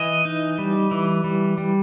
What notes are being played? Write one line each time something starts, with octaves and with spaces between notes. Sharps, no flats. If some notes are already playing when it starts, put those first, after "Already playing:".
Already playing: E3 D#5
D#4
G3
E3
G3
G3